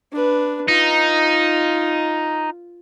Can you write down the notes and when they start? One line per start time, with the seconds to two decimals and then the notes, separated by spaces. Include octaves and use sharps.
0.12 D4 B4
0.68 D#4 F4